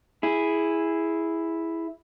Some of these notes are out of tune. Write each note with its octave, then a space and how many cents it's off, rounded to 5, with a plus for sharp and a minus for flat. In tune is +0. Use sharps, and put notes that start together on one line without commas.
E4 +0 G#4 +0